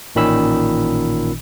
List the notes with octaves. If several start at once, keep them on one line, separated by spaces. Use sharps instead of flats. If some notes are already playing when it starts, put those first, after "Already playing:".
A1 A#2 D#3 C#4 B5 E6